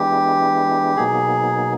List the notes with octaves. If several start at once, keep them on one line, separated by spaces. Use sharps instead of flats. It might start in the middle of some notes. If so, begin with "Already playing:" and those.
Already playing: E3 G#3 B3 D4 G4
B2 F#3 A#3 D#4 G#4